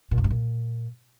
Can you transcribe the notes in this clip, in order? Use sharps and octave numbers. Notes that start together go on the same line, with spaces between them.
A#2
F#2
G#2
A#2